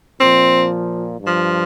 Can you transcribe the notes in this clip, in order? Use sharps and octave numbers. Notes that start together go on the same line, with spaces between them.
A#2 F3 C4
G2 F3